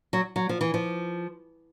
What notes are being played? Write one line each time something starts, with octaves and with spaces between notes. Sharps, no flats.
F#3
F#3
F3
E3
F3